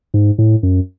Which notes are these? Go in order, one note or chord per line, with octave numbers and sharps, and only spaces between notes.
G#2
A2
F#2